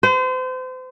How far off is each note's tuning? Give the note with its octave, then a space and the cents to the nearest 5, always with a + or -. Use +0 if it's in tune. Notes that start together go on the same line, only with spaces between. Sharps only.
C5 -35